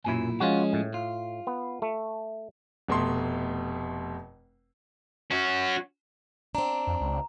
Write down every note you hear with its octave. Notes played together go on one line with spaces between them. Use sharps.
B1 F#2 A#2 E4 G#5
F3 G#3 C#4 F4 F#4
A2
F4
B3
A3
F1 B2 A3 C6
C#4 F#4
C4 D4 A#5
F2
C#2